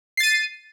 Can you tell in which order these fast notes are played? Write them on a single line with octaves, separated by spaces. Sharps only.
C7 A6 D#7